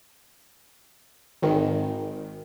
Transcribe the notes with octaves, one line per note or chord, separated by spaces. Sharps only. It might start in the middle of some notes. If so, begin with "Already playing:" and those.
G#1 D#3